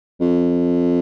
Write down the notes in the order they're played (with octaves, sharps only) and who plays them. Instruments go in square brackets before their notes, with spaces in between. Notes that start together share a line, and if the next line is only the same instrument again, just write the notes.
[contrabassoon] F2